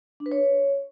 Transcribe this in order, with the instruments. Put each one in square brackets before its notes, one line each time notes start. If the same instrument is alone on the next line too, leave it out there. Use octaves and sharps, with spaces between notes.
[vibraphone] D4
B4
C#5